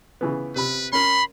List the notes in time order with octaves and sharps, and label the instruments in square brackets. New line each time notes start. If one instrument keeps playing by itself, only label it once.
[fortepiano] C#3 E3 B3
[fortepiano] C3 B5 [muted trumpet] B4
[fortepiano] C#4 A#4 [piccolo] B5 [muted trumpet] C6